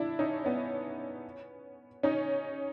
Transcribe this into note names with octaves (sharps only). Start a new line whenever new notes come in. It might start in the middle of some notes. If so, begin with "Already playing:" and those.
Already playing: D4 E4
C#4 D#4
B3 C#4
C#4 D#4